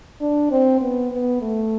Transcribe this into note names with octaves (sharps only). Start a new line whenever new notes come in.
D4
C4
B3
B3
A3